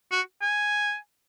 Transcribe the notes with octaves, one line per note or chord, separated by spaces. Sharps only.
F#4
G#5